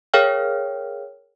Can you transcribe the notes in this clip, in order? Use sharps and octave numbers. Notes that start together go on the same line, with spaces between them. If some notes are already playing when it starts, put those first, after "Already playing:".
G#4 A#4 C#5 F5 G5 F6